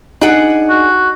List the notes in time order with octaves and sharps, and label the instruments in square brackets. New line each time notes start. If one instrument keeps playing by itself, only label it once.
[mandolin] D4 G#4 F#5 [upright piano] D#4
[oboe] F#4